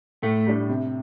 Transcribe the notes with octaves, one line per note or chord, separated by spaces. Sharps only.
A2 A3
G3 D4
C3